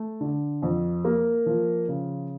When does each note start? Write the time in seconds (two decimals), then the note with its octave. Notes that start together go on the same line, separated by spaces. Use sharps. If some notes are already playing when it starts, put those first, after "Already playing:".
Already playing: A3
0.21 D3
0.62 F2
1.05 A#3
1.46 F3
1.88 C#3